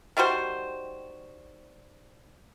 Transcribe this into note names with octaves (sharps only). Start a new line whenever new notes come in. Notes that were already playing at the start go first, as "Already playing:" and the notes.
D#3 G3 F#4 C5